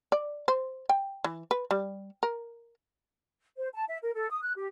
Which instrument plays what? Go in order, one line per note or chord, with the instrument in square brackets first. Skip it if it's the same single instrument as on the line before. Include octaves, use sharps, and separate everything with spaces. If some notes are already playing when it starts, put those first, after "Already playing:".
[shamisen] D5
C5
G5
E3
B4
G3
A#4
[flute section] C5
A5
E5
A#4
A4
D#6
F#6
G4